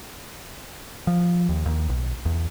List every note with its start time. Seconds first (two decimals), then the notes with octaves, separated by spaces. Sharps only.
1.07 F3
1.49 D#2
1.66 D#2
1.89 B1
2.25 E2